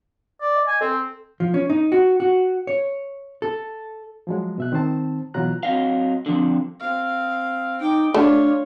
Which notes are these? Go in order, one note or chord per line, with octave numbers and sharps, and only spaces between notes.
D5
D#5
G#5
C4 A4
F3
C#4
D#4
F#4
F#4
C#5
A4
F3 F#3 G#3
B2 E5 F#6
D#3 C4 D#4 C5 A5
B2 E3 F#3 F4 A#5 F#6
F#3 C4 D#5 F5
D3 F3 C4
C4 F5
D#4 G5 D6
A3 D4 F4 C#5